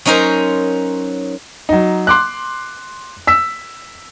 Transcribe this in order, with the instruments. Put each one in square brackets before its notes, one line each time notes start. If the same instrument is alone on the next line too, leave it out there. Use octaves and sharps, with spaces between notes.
[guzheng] F#3 C#4 D#4 A#4 C5
[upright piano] F#3 D#4
C6 D6 F#6
E6 B6